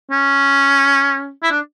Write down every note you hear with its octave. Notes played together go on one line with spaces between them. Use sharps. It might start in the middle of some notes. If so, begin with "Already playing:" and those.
C#4
E4
D4